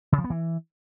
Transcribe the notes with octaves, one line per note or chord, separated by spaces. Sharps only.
C#3
F3
B3
E3